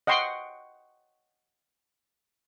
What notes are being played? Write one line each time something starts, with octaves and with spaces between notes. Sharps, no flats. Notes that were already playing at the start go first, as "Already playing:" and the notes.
D#5 F#5 G5 C6 C#6